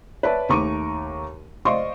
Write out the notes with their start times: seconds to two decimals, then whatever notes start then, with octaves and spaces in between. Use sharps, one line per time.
0.23 B4 C#5 D5 E5 A5
0.49 D#2 A3 A#5 C#6 D6 D#7
1.65 C5 D5 D#5 F5 C6 C#6